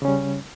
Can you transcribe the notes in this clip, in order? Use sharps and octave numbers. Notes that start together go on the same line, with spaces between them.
C#3 G3 C#4